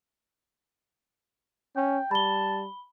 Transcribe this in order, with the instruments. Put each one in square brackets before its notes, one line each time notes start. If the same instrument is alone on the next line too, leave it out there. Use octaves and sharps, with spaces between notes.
[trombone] C#4 [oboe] G5
[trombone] G3 [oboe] A5 [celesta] B5 G7